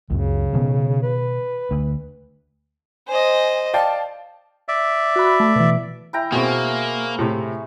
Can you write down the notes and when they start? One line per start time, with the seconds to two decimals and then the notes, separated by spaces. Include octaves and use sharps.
0.10 C#2 F#2 C#3 F#3
0.53 B2 D#3 B3
1.03 B4
1.71 D2
3.08 C5 D#5 G#5
3.74 D5 F5 G5 A5
4.68 D5 E5
5.16 F#4 B5
5.40 A3
5.56 B2 E3
6.13 E4 G5 A#5
6.32 B2 A#3 C4 G#4 C#5
7.18 A2 C3